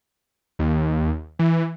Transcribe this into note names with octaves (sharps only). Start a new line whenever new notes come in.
D#2
E3